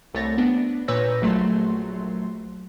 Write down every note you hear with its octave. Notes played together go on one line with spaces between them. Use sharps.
C2 A3 C#5 A6 A#6
B3 D4
A#2 B4 C#5 E6 G6 A#6
A#1 F#3 A3 C6